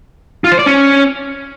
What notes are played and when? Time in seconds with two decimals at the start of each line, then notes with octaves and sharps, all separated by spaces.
0.44 F4
0.52 C5
0.59 D5
0.66 C#4